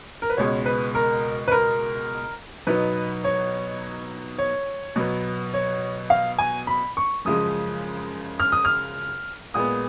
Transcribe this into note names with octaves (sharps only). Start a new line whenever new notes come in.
A#4
B4
C#2 B2 G#3 C#5
B4
A#4
B4
A#4
B2 F#3 B3 D#4 B4
C#5
C#5
B2 F#3 B3
C#5
F5
G#5
B5
C#6
F#2 C#3 F3 G#3 D#6
F6
D#6
F6
A#2 G#3 B3 D#6